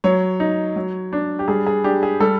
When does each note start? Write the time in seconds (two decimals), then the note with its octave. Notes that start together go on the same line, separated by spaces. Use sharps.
0.04 F#3 C#5
0.40 D#4
0.76 F#3
1.13 D4
1.39 G4
1.48 G3 G#4
1.67 G#4
1.84 D4 G4
2.03 G#4
2.20 G3 A4